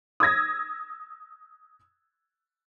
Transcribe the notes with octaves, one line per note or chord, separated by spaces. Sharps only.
D#6 E6 G#6 A#6